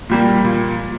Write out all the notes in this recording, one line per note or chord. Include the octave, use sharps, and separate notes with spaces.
A#2 G3 A#3
A#2